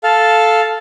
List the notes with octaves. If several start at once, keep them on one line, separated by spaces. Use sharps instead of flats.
A4 F5